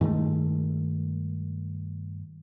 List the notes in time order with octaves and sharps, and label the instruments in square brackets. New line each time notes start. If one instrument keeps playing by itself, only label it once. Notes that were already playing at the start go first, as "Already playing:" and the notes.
[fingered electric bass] G2 D#3 G#3 A3